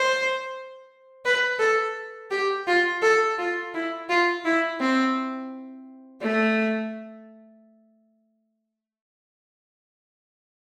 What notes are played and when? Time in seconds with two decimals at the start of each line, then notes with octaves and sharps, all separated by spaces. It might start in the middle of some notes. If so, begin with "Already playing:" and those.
Already playing: C5
1.25 B4
1.60 A4
2.31 G4
2.67 F4
3.03 A4
3.38 F4
3.74 E4
4.10 F4
4.45 E4
4.81 C4
6.22 A3